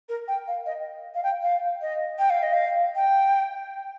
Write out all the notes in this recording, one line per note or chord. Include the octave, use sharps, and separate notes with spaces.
A#4
G5
F5
D#5
F5
G5
F5
D#5
G5
F5
D#5
F5
G5